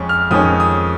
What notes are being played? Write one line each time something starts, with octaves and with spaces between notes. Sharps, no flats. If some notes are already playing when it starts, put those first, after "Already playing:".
Already playing: F2 G#3 C#4
F6
F2 D#3 G#3 C#4 D#6
D#6